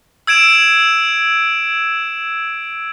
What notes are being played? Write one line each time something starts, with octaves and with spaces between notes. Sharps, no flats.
E6 G#6 D7 E7